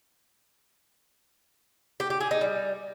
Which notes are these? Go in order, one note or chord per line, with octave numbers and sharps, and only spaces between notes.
G4
G4
G#4
D#4
G3